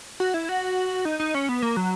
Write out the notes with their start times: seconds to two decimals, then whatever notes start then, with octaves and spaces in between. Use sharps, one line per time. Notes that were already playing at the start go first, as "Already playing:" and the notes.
0.20 F#4
0.34 E4
0.49 F#4
1.05 D#4
1.20 D#4
1.35 C#4
1.49 B3
1.62 A#3
1.77 F#3